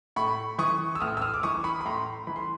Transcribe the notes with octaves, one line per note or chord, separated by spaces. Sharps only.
A2 B5 C#6
E3 C#6 D#6
E6
A2 D#6 F6
E6
D#6 F6
D6
E3 C#6 D#6
B5 C#6
B5
A2 A#5 C6
E3 B5
C6